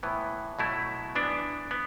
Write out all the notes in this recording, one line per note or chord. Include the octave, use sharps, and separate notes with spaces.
A2 E3 B3
B2 F#3 A3 E4
E3 B3 D4
B3